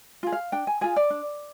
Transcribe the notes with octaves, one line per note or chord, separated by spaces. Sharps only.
F4 G#4
F5
D4 G5
G#5
F4 G#4 G#5
D5
D4